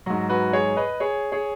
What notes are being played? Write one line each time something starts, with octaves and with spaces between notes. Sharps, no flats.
G#2 F#3 F#4
F#4 B4
G#4 C#5
B4 D#5
G#4 C#5
G#4 C#5